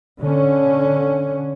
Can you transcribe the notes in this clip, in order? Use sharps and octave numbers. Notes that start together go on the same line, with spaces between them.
D3 C#4